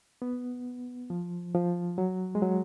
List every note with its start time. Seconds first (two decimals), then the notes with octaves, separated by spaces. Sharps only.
0.22 B3
1.10 F3
1.55 F3
1.98 F#3
2.35 G#3
2.42 F#3